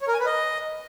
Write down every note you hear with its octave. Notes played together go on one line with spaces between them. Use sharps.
C#5
A#4
G#5
B4
D#5